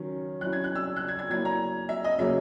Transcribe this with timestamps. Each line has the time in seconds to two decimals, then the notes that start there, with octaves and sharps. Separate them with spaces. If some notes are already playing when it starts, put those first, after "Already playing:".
Already playing: D#3 F#3 C#4
0.41 F#3 C#4 E4 F#6
0.53 G#6
0.64 F#6
0.75 E6
0.96 F#6
1.08 G#6
1.19 G#6
1.30 F#3 A#3 E4 G#6
1.45 A#5
1.89 E5
2.04 D#5
2.19 C#3 F#3 A#3 E5